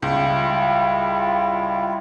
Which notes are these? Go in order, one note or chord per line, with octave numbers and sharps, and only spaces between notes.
C#2 G3 E4 F4